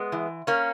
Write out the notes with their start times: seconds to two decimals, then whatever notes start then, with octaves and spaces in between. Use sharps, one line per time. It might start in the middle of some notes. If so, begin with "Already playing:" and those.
Already playing: G#3 B3
0.12 E3
0.47 A#3 C#4